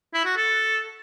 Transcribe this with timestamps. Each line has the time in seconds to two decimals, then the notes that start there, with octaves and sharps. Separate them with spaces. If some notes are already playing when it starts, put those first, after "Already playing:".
0.14 E4
0.25 F#4
0.37 A4